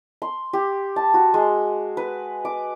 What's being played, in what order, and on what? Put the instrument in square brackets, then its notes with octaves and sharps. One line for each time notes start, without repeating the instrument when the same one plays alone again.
[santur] C6
G4
A5
F#4
G#3
B4
D6